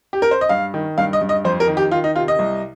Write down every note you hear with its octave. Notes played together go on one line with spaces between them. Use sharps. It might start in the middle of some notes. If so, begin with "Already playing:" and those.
G4
A#4
C5
D#5
G2 F5
D#3
G2 F5
D#5
G2
D#5
F2 C5
A#4
D#3
G4
D#3 F4
D#4
C3 F4
D#5
C2